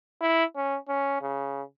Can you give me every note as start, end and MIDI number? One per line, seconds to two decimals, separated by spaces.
0.21 0.44 64
0.56 0.76 61
0.89 1.18 61
1.21 1.62 49